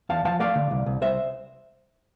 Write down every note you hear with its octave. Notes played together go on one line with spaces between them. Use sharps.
E2 F5 A5
F3 F5 A5
A3 D5 F5
D3
C2
C2
C2 C5 E5